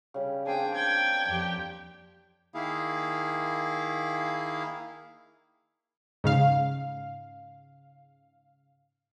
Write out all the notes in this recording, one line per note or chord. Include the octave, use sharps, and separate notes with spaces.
C#3 G3
A#3 C4 D4 G#4 G5
G5 G#6
F2 G4
D#3 A#3 E4 G#4 F5
G#2 C#3 F5